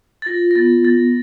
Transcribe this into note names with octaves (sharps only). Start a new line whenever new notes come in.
A6
F4 A#6
A#6
B3 A6
B3 A6